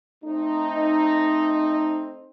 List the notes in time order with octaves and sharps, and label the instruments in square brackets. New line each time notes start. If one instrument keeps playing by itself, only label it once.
[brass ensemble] A3 C4 D#4